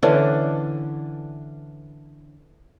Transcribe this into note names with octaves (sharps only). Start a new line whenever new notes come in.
D3 E3 C#4 D4